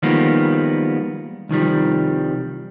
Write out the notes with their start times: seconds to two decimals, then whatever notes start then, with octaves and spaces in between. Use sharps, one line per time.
0.03 D#3 F3 G3 G#3 A#3 B3
1.49 C2 D#3 F3 G3